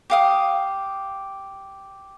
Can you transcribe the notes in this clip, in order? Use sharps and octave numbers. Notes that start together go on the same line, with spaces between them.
G4 F5 D#6